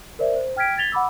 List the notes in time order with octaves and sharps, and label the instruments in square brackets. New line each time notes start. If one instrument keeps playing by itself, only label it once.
[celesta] A#4 C5 D5 E5
C5
G5 F6 G#6 B6 D7
G#6 A6 B6 F7 G7
F#5 B5 D6 E6